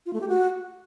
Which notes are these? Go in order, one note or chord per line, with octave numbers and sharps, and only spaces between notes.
F4
A3
G4
F#4